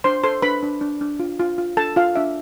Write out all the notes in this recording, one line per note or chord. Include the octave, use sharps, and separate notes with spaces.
D4 C5 C6
A4 C5 C6
D4 B4 B5
D4
D4
D4
F4
F4
F4
D4 A4 A5
F4 F5
D4 E5